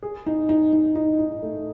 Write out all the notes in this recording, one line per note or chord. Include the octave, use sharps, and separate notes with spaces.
G#4
D#4
D#4
D#4
D#4
D#4
A3